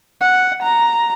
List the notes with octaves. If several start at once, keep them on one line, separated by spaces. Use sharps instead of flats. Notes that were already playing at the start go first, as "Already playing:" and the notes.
F#5
A#5